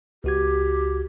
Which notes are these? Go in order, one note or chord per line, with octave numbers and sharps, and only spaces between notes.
C#2 F#4 G4 G#6